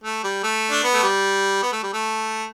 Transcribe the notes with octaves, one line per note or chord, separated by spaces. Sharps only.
A3
G3
A3
D4
B3
A3
G3
B3
A3
G3
A3